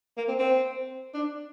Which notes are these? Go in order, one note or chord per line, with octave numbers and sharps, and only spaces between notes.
A#3
C4
C4
D4